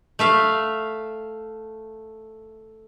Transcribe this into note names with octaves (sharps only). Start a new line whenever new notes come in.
A3 E5 F5